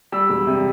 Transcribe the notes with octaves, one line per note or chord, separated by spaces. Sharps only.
G3 E6
E1
C3